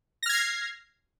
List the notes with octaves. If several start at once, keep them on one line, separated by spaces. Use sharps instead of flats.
F6 G#6 A#6 C7